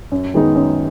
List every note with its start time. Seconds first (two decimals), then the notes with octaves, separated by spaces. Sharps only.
0.12 F#2
0.34 D#3 G#3 B3 D#4
0.56 F#2